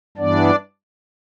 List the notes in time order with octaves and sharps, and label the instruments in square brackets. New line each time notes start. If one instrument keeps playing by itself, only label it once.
[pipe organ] G2 E3 B3 D4 D5